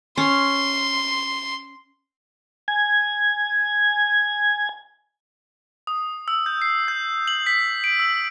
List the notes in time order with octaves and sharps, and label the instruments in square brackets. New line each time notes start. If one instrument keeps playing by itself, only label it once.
[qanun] C#4 [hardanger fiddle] C6
[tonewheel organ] G#5 G#6
[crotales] D#6
E6
G6
C7
G6
F#7
B6
D7
E6